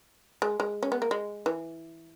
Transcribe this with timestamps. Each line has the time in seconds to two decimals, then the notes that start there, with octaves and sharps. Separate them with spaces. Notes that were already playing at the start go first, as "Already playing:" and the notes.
0.42 G#3
0.60 G#3
0.83 C#4
0.92 B3
1.02 A#3
1.11 G#3
1.46 E3